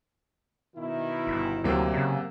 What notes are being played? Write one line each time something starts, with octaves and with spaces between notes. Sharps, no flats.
B2 D#3 E4
G1
D2 C3 F#3 A#3
C#3